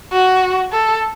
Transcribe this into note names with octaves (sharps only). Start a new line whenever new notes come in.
F#4
A4